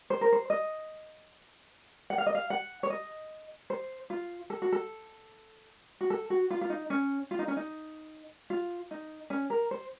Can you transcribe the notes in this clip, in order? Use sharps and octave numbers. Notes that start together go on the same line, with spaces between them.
C5
A#4
C5
D#5
F#5
F5
D#5
F5
F#5
C#5
D#5
C5
F4
A4
F#4
A4
F#4
A4
F#4
F4
F4
D#4
C#4
F4
D#4
C#4
D#4
F4
D#4
C#4
A#4
C5